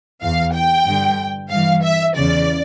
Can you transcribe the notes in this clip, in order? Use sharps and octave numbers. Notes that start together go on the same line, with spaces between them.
E2 E3 F5
G5
G2 D3
G2 E3 F5
E5
E2 C#3 E3 D5